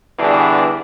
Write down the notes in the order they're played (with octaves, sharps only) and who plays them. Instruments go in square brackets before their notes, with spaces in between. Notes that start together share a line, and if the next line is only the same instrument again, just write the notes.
[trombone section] B2 D3 E3 G3 D4 G#4